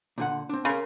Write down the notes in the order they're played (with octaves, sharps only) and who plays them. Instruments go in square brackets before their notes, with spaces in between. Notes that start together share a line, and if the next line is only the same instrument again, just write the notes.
[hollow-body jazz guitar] A#2 D3 F#5
C4 D4
[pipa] C#3 [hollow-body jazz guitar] A#4 C6